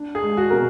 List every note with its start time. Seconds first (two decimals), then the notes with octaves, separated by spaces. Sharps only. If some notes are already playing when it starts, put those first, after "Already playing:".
Already playing: D4
0.15 G#4
0.23 G#3
0.37 F#4
0.50 B2 A#4